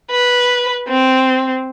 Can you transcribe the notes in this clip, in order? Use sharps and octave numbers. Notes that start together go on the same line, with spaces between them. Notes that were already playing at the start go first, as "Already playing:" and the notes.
B4
C4